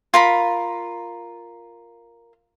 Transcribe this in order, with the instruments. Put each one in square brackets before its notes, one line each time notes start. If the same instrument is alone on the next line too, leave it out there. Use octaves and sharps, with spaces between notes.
[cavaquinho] F4 A#4 B5